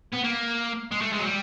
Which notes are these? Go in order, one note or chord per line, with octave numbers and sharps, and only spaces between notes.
B3
A#3
G#3
A3
G#3
F#3
G3